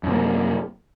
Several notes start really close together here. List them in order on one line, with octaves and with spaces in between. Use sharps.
F#2 C3 A#3